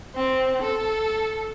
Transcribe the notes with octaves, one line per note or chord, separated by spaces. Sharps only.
C4
A4